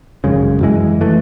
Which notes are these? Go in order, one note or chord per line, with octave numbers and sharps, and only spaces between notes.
G#1 F#2 C#3 G#3
F#2 E3 G#3
E3 A3